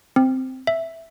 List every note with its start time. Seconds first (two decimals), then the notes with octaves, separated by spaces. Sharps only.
0.16 C4
0.67 E5